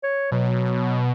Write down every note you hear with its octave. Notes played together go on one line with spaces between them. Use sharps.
C#5
B2 F#3